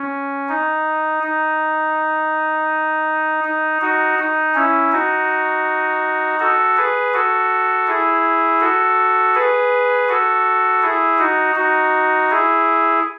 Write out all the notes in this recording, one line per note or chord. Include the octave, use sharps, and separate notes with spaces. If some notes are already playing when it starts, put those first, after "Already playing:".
Already playing: C#4
D#4
D#4
D#4
D#4 F#4
D#4
C#4 E4
D#4 F#4
F#4 A4
G#4 B4
F#4 A4
E4 G#4
F#4 A4
G#4 B4
F#4 A4
E4 G#4
D#4 F#4
D#4 F#4
E4 G#4